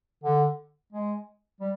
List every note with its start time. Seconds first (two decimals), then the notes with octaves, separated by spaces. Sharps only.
0.23 D3
0.92 G#3
1.61 G3